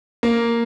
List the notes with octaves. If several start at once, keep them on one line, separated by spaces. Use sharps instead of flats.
A#3